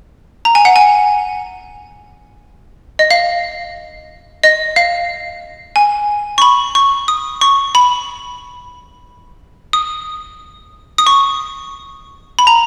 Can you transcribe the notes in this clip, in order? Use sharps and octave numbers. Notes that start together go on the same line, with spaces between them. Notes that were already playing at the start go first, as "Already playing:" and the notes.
A#5
G#5
F#5
G#5
D#5
F5
D#5
F5
G#5
C#6
B5
C#6
D#6
C#6
B5
D#6
D#6
C#6
B5
A#5